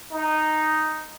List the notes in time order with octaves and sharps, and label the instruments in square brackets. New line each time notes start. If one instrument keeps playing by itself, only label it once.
[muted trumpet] D#4